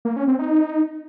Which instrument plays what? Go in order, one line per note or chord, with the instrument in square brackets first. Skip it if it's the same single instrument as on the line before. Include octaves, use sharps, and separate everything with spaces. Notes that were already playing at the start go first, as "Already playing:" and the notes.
[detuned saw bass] A#3
C#4
C4
D#4
D#4